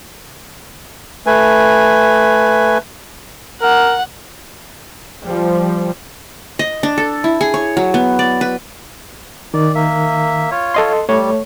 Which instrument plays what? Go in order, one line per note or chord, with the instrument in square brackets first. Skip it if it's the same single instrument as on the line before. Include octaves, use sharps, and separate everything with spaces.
[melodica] A3 B4 G#5
[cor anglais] A#4 [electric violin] F#5
[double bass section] F3 G3
[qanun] D#5
D4
A4
E4
G#4
C#5
F#3
B3
D5
B4
[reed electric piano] D#3 [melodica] D5
[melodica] A#3 E5
F4 C#5
[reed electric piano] A4 D#5 C6
[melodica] G3 [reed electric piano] A3 C#5